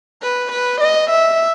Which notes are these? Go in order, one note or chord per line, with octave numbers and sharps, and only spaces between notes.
B4
B4
D#5
E5